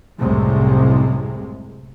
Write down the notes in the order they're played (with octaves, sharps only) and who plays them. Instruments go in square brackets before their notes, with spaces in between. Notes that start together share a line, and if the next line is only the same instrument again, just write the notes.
[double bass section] C2 F#2 A2 C3 G#3